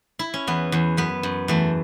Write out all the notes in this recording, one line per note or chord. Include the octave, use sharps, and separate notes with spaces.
E4
C#4
E2 B3
E2
F#2 B3
F#2
E2 A3